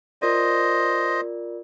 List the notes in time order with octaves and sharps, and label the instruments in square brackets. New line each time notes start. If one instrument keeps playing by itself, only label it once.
[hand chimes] F4 A#4 D5 [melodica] C5 D#5